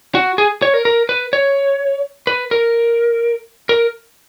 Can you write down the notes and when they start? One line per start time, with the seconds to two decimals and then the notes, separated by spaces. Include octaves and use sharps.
0.15 F#4
0.38 G#4
0.62 C#5
0.74 A#4
0.85 A#4
1.09 B4
1.33 C#5
2.27 B4
2.51 A#4
3.69 A#4